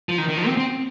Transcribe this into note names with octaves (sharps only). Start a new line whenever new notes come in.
F3
D#3
D#3
F3
C4
C4